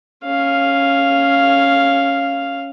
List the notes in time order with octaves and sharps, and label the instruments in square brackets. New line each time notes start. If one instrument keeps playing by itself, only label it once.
[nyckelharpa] C#4 F5